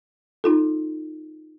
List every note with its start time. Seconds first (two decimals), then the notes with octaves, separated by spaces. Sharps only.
0.44 D#4 F4 A4